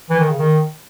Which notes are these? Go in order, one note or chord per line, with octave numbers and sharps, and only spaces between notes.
E3
D#3
C#3
D#3